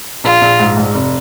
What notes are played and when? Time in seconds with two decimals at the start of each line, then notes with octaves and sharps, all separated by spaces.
0.24 A#1 F4
0.41 A#1
0.60 G#2
0.77 G#2
0.94 F1